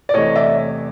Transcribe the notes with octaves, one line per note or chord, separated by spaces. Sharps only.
D5
E2 C3 E3 A3 C#5 D#5
D5 E5